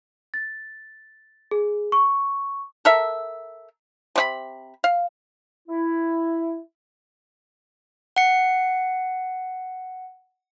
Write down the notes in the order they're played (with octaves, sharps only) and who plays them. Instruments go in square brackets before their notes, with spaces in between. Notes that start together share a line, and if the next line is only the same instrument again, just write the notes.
[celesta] A6
G#4
C#6
[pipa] A4 A#4 E5
C3 D4 B5
F5
[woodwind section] E4
[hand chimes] F#5 C#7